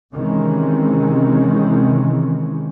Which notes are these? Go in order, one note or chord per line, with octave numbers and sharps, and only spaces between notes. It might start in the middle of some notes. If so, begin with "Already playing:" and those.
C3 D#3 E3 G#3 C4 C#4